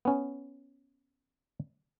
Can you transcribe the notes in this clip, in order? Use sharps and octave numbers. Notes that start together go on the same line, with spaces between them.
B3 C#4